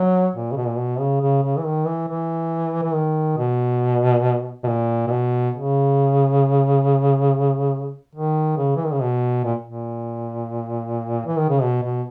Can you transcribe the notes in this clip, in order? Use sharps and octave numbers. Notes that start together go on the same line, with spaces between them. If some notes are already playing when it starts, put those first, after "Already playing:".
Already playing: F#3
A#2
C#3
B2
A#2
B2
C#3
C#3
C#3
E3
D#3
E3
E3
E3
D#3
B2
B2
A#2
A#2
B2
C#3
D#3
C#3
E3
D#3
C#3
B2
A#2
A#2
E3
D#3
C#3
B2
B2